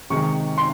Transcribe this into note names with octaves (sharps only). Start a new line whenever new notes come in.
C3 D#3 G#3 C#6
C6